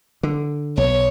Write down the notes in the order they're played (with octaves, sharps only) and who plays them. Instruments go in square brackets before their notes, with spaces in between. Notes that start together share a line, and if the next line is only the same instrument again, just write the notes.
[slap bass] D3
[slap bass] B1 [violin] C#5